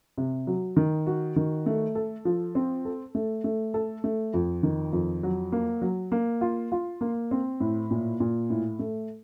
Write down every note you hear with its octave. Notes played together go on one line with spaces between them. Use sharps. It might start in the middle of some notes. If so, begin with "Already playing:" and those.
C3
F#3
D#3
F#4
D#3
A3
A4
F3
C4
A4
A3
A3
A4
A3
F2
D#3
F2
F#3
A#3
F#3
A#3
F4
F4
A#3
C4
A2
A#2
A#2
A2
A3